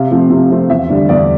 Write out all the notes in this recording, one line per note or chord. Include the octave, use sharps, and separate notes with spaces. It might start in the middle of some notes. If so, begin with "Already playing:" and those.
Already playing: C3 F5
F3 A3 C4
C3
F3 A3 C4
E2 E5
D3 G3 D4
E2 D5